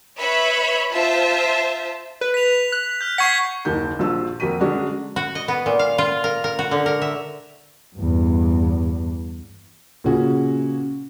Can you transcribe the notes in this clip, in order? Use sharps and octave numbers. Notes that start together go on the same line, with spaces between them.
B4 C#5 E5 B5
F4 C5 E5 A5
B4
B6 F7
F#6
F6 G6
F#5 C#6 G#6 B6 C7
F#1 D#2 A#3 F#4 G6
A#1 F3 F4 F#4 E6
F2 A#3 F#4 B6 D#7
D3 F#3 G#3 C#4 D4 F#4
F#4
D#5
B3
A#2
F5
F4
A#4
A#4
F#4
D3
A#4
E5
E2 G2
A#2 C#3 C#4 F#4 G#4